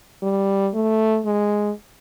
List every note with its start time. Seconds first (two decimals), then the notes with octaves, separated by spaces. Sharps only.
0.23 G3
0.74 A3
1.25 G#3